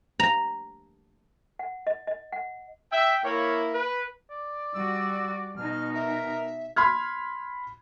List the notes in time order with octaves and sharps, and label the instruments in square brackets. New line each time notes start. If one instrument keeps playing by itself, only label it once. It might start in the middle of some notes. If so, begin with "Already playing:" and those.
[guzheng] A#5
[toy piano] F#5
D#5
D#5
F#5
[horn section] E5 [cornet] G5
[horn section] A#3 E4 [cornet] C#5
[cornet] B4
[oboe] D5
[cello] G3 F#4 [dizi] E6
[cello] B2 D#4 [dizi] F6
[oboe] A#4 [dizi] E5
[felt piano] B5 C6 F6 G#6